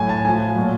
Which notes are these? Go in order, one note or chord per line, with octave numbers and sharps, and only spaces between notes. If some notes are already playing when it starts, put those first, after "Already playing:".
Already playing: A2 F#3 G#5
A5
A2 F3 G#5
A#2 F#3